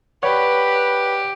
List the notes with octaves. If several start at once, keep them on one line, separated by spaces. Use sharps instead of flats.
G4 B4 C#5 D5 F#5